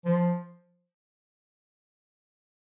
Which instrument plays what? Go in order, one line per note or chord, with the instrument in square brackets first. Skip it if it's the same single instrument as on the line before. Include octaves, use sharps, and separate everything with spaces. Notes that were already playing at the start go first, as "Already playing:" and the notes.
[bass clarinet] F3